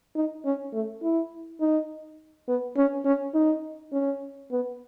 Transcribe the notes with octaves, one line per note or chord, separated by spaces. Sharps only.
D#4
C#4
A3
E4
D#4
B3
C#4
C#4
D#4
C#4
B3